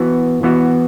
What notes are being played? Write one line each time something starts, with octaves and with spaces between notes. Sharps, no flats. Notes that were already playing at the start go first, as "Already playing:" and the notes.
Already playing: E3 B3 F#4
E3 B3 F#4